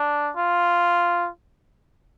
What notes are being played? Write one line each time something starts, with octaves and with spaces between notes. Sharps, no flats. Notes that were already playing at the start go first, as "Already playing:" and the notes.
Already playing: D4
F4